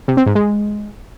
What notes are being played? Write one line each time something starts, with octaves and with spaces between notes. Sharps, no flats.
C3
C4
G#2
G#3